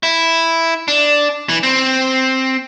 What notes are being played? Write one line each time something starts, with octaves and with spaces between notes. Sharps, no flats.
E4
D4
E3
C4